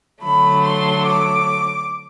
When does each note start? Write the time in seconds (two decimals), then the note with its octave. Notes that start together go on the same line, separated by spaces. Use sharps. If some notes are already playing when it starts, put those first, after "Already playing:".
0.23 D3 F#3 A3 B5
0.63 C6
1.05 D6